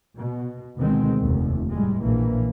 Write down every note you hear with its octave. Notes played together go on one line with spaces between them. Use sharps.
B2
D2 B2 D#3 G#3 C4
F1 D#2
A2 G3 G#3
A#1 E3 A#3